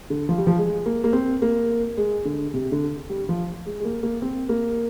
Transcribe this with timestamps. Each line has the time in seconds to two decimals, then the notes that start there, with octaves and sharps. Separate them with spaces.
0.10 D3
0.29 F3
0.38 G3
0.47 F3
0.58 G#3
0.86 A#3
1.04 A#3
1.13 C4
1.42 A#3
1.97 G#3
2.25 D3
2.54 C3
2.72 D3
3.09 G3
3.29 F3
3.66 G#3
3.80 G#3
3.85 A#3
4.03 A#3
4.22 C4
4.49 A#3